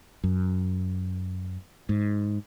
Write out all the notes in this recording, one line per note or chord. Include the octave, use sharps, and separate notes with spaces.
F#2
G#2